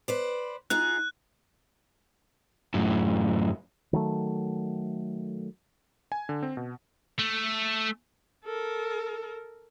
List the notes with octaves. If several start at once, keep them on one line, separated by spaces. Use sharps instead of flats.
B4 C5 D5
D#4 F4 G#4 F#6
F#2 A2
D#3 F#3 A3
G#5
D3
C4
B2
A3
A4 A#4